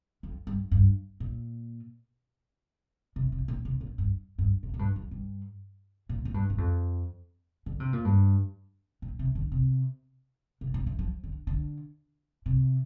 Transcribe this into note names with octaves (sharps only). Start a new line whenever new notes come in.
F2
G2
G2
A#2
C3
C3
A#2
C3
A#2
G2
G2
A#2
A#2
G2
F2
G2
A#2
A#2
G2
G2
F2
D3
C3
A#2
G2
A#2
C3
D3
C3
C3
A#2
D3
F3
D3
D3
C3